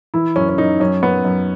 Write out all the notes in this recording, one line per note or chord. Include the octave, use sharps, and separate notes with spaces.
E3 E4
F#2 C#4
C#4
F#2 D#4
F#2 C#4
F#2 B3
F#2